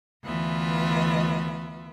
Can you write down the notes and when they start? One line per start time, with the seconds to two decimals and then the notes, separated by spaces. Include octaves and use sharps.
0.24 D2 E3 B3 F4 E5